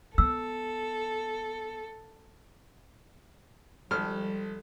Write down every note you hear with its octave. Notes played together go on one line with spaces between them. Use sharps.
B3 A4 E6
G#1 F3 G3 A4 F6